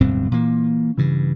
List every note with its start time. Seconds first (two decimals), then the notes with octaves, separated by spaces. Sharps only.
0.01 D1 G2 B2 C4
0.31 A#2 E3 A#3
0.98 G2 C#3 E3